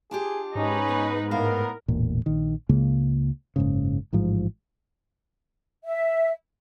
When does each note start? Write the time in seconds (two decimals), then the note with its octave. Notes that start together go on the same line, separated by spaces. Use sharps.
0.11 D4 F4 G4 G#4
0.55 G#2 C#4 D#4 B4
0.89 B3
1.31 A2 B3 A#4 F5
1.88 E1 A1 A#2
2.26 A#1 D#3
2.69 C#2 C#3 G#3 A#3
3.56 F#1 G#2 C#3
4.13 A1 G#2 F3
5.84 E5